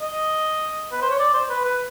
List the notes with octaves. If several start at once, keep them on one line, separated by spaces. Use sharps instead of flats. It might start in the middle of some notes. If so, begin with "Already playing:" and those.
D#5
B4
C5
C#5
D5
C5
B4
B4